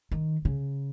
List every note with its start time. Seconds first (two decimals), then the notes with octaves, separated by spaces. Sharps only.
0.11 D#3
0.45 C#3